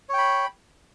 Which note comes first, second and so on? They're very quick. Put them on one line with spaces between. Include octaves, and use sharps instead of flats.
C#5 G5 B5